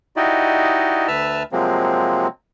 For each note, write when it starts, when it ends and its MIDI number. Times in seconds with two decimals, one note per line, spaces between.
0.16 1.07 63
0.16 1.07 64
0.16 1.07 66
0.16 1.07 67
0.16 1.07 74
0.16 1.07 75
1.08 1.43 38
1.08 1.43 71
1.08 1.43 76
1.08 1.43 81
1.08 1.43 88
1.08 1.43 89
1.52 2.27 48
1.52 2.27 53
1.52 2.27 54
1.52 2.27 56
1.52 2.27 58
1.52 2.27 60